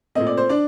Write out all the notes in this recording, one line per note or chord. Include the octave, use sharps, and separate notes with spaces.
A#2 A3 C4 D#5
D5
C5
D4 D5